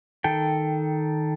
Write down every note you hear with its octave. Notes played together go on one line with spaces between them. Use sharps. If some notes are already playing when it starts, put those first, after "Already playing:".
D#3 A4 G5